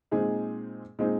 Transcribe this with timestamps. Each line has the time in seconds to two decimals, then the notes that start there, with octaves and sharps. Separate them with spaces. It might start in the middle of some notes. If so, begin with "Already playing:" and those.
0.11 A#2 G#3 C4 D#4 G#4
0.99 A#2 G#3 C4 D#4 G#4